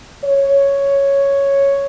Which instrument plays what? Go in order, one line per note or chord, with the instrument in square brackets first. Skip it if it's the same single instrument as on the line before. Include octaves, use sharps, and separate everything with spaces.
[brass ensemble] C#5